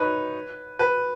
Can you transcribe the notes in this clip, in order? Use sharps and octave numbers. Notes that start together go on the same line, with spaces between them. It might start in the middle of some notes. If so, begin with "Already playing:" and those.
Already playing: D#4 B4 C#5
B4